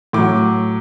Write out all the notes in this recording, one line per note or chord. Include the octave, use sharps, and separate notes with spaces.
A2 F#3 D6